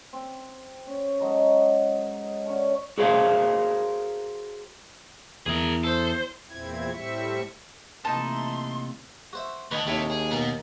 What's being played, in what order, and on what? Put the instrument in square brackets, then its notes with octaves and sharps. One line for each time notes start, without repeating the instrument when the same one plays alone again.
[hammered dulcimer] C4
C#4
F#3 G#3 D#4 A4
D3 C#4 C#5
[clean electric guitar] F#4 G#4 A#4 C5 C#5 F5
[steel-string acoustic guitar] E2 [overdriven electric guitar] G#4 A#4
[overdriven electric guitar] A4 [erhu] C5
[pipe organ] E2 A#2 C4 E4 G#6
A2 G3 C4 E5 C#6
[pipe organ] C3 A#3 C4 [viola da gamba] E3 A3 [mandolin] D#4 A5 [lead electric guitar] C6
[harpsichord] F#4 C5 E5
[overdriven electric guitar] D2 D3 [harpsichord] B4 D#5 C#6
[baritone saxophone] D#2 [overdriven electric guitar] C3 [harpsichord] E4 A4 C#5
[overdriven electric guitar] G#4
[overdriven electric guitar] B2 [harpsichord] A#4